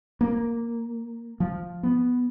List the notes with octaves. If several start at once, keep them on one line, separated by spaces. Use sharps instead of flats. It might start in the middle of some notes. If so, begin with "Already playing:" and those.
A#3
F3
B3